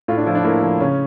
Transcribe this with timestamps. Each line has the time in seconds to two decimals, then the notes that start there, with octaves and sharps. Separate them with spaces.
0.08 A2 F4
0.18 D4
0.26 F3 E4
0.35 D4
0.44 A2 A#3
0.63 F3
0.80 C#3 C#4